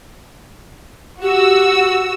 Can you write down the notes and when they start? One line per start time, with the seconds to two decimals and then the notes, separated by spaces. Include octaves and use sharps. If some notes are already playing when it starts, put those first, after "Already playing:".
1.22 F#4 G4 E6